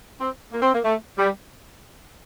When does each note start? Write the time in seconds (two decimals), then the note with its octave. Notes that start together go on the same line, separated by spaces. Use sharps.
0.20 C4
0.52 A#3
0.62 C4
0.74 A#3
0.84 A3
1.18 G3